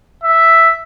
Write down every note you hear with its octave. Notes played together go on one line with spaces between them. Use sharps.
E5